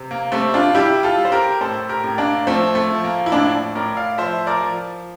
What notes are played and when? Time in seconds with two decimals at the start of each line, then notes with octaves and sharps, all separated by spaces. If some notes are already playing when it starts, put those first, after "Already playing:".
Already playing: C3
0.11 A#3
0.32 G3 A3 C4
0.54 D4 F4
0.75 G3 E4 G4
1.03 F4 A4
1.18 G3
1.25 C5
1.32 G4 A#4
1.61 A2 A4 C5
1.89 G4 A#4
2.04 A2
2.18 A#3 D4
2.47 F3 A3 C4
2.75 A3
2.90 F3
3.04 A#3
3.26 E4
3.32 A2 A#3 D4
3.75 A2 A#4 D5
3.97 D5 F5
4.18 F3 C5 E5
4.47 A#4 D5
4.62 F3